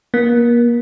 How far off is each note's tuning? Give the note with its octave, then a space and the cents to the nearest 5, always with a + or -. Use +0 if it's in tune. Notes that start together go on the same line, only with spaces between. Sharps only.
A#3 +35